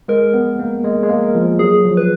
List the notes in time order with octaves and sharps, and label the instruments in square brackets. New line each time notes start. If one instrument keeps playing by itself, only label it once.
[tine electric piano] G#3 [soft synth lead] A#4
[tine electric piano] B3
A#3
G#3
G#3
A#3
F3
[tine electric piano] F#3 [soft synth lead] G#4
[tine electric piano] F3
[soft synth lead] B4